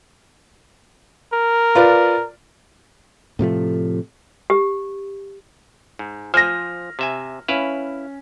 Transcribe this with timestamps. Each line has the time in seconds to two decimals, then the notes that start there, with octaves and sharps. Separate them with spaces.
1.33 A#4
1.75 F4 B4 D5
3.39 A2 C3 F3 A3
4.50 G4
5.99 G#2
6.34 F3 C5 G#5 F6 A#6
6.99 C3 E5 G#5
7.48 C#4 E4 B4 F5